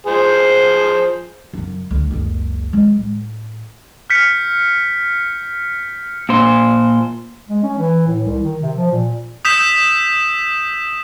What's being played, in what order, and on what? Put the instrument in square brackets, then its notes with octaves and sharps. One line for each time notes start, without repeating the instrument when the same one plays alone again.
[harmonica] F3 G#4 C5
[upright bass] F#2 C#3
D2
F#1 C#2
G#3
A2
[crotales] F6 G6 B6 C#7
[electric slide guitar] A#2 C5
[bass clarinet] G#3
C#4
E3
A2
C2
D#3
C3
F3
A#2
[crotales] D#6 E6 G6 B6 E7